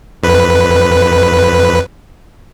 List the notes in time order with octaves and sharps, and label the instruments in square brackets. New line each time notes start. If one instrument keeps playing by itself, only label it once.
[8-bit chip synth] F2 B4